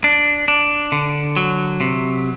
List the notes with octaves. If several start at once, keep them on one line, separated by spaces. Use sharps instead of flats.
D4
D4
D3
F#3
C3